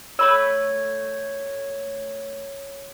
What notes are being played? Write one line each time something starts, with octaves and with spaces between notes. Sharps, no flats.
A3 C#5 B5 E6